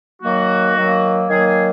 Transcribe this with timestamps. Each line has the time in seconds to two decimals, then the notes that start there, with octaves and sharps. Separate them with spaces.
0.21 D#3 F#3 A#3 F#4
0.76 D#3 F#3 A#3
1.29 D#3 F#3 A#3 G#4
1.46 G#4